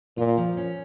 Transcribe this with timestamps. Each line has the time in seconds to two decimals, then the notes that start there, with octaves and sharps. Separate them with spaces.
0.18 A#2 F4
0.37 F3
0.57 C#4